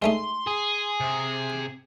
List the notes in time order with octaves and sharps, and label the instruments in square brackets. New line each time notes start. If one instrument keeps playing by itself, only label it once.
[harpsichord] G#3 A3 D#4 [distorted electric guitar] C6
[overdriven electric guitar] G#4
[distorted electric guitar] C3